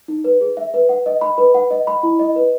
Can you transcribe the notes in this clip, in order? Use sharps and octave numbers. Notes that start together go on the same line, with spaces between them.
D#4
B4
G#4
E5
B4
F#5
D#5
B5
B4
F#5
D#5
B5
E4
D#5
B4